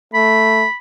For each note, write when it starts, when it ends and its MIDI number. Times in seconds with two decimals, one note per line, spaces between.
0.14 0.67 57
0.14 0.76 83